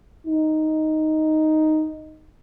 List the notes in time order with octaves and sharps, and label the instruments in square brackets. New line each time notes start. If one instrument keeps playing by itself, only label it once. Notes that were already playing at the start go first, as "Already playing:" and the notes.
[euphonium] D#4